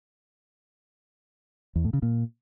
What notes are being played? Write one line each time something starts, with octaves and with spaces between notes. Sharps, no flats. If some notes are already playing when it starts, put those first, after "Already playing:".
E2
A2
C#3
A#2